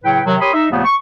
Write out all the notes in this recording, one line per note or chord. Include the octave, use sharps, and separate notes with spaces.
A2 C#3 F#3 B4 C#5 G5
C3 D#3 F#3
G4 A#4 C#5 B5 C6 D#6
D#4 E5
D#2 A#2 C#3 F3 A3 B3
C#6